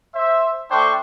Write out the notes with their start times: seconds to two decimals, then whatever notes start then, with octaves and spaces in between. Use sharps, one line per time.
0.14 C5 E5
0.70 A3 D4 C5 G5 C#6